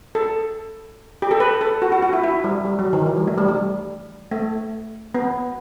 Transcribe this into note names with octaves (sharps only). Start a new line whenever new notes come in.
A4
G4
A4
B4
A4
F#4
F#4
F#4
E4
E4
G3
G3
F#3
D#3
E3
G3
A3
G3
G3
A3
B3